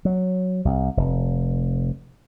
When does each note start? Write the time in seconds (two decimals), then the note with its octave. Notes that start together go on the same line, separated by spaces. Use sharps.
0.05 F#3
0.65 C2
0.97 F1